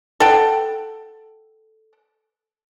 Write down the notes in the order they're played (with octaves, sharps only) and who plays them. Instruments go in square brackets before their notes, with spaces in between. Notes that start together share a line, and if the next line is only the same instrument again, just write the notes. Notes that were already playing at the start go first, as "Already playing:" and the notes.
[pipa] A4 F#5 G5